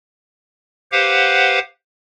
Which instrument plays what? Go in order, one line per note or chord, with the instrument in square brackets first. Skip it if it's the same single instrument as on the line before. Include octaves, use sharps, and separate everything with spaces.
[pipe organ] G4 B4 C5 F5 F#5